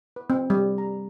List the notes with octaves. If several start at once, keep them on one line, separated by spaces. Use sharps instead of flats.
B4
C4
G3
A#5